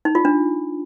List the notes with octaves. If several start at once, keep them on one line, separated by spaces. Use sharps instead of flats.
D#4
F4
D4